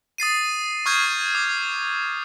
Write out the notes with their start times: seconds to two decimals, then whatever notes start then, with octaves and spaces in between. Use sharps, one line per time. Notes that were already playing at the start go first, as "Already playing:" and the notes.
0.18 D#6 A6 C7 D#7
0.86 C#6 D#6 F6 G6 G#6 C7
1.35 D6